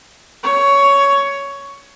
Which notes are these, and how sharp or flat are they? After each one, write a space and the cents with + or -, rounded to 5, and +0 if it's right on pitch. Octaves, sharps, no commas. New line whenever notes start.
C#5 +10